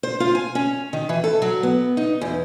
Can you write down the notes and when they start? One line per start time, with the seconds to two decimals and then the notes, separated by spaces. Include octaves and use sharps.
0.03 C5
0.20 F4
0.35 G#5
0.55 C#4
0.93 D#3
1.09 E3
1.24 A4
1.42 F#3
1.63 B3
1.97 D#4
2.21 E2